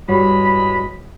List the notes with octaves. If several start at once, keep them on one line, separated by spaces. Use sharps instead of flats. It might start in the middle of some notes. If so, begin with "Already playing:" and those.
E2 G2 G3 G#3 F#4 C#5 B5